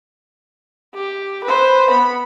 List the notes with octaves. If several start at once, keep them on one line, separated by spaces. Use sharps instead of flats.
G4
B4 C5
B3 B5